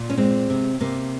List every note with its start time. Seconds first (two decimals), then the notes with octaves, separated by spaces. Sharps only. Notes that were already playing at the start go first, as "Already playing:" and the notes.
Already playing: A#2
0.10 C#4
0.17 G#3 C4
0.50 C3
0.81 C3 A#3